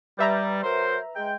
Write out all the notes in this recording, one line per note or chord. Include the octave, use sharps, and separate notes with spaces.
G3 B4 E5 A#5
F#3 A#4 C5
G#3 G5